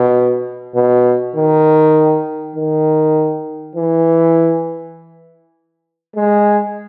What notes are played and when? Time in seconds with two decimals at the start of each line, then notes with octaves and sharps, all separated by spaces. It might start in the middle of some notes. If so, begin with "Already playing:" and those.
Already playing: B2
0.75 B2
1.36 D#3
2.56 D#3
3.75 E3
6.16 G#3